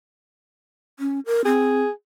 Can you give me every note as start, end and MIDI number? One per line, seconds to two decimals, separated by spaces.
0.99 1.20 61
1.26 1.42 70
1.45 1.83 60
1.45 1.90 68